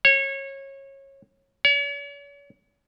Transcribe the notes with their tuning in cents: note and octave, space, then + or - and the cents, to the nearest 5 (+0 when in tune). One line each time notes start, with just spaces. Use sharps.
C#5 -25
C#5 +40